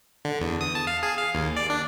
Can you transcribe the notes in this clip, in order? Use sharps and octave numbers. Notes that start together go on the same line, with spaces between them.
D3
E2
D#6
A5
F5
G#4
F5
D#2
D5
D4